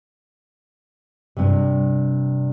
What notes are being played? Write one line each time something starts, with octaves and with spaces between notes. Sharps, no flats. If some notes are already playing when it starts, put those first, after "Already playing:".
G2 C3